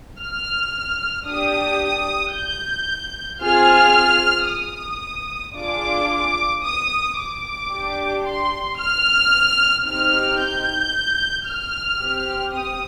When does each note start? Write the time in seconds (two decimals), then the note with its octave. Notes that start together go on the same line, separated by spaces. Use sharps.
0.20 F6
1.27 D4 G4 D#6
2.34 G6
3.41 C4 F4 G#4 F6
4.49 D#6
5.56 D4 F4 G#4 D6
6.64 D#6
7.18 D6
7.71 D4 G4
8.26 C6
8.79 F6
9.86 C4 D#4 G4 F6
10.40 G6
11.47 F6
12.01 C4 G4
12.55 D#6